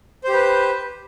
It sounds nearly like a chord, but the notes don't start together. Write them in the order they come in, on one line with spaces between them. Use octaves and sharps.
C5 G4 B4